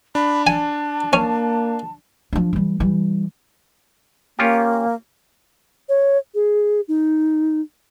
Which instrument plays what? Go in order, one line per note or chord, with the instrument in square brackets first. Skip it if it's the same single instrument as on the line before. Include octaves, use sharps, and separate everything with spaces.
[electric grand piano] D4 [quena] B5
[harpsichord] G#5 [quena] A5
[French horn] A#3 [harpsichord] C#4
[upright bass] F3 D4
E3 G3
E3 G3
[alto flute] A#3 [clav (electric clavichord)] C#4 F4 G4
[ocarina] C#5
G#4
D#4